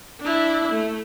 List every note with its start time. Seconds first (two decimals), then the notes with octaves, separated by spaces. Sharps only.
0.20 D4 E4
0.72 A3